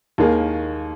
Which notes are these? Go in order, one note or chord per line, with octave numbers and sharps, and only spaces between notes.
D#2 D#3 A#3 G#4